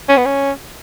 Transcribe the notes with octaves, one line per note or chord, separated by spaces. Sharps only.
C#4
B3
C#4